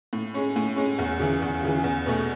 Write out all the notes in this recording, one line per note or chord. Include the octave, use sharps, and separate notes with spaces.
A2
G#3 C#4
A2
G#3 C#4
E2
C#3 E3
E2
C#3 E3
E2
B2 A3